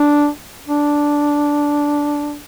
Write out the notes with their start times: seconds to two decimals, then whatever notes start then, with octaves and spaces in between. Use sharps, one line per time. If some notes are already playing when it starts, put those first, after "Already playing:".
Already playing: D4
0.67 D4